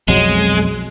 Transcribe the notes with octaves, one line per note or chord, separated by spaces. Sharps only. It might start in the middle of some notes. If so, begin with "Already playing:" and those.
B1 F2 F#3 G#3